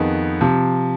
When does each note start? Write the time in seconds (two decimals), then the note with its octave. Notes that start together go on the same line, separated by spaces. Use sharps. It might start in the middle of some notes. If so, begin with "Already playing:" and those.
Already playing: F2 D#3 B3 D#4 G#4
0.41 C3 F3